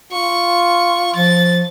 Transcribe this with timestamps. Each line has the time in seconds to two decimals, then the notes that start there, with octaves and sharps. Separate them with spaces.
0.12 F4 C#6
1.16 F3 A6